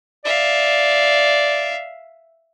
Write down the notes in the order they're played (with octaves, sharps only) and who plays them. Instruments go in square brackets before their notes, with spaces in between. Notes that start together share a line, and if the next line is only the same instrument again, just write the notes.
[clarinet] D5 [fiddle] E5 F5